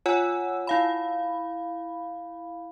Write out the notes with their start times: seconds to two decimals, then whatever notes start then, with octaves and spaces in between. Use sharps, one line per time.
0.06 F4 C#5 F#5 G#5 E6
0.67 E4 F5 B5